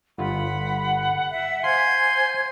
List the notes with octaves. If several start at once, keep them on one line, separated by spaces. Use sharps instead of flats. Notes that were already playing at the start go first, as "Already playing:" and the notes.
G1 F4 F#5 B5
E5
C5 F5 G#5 C6 G#6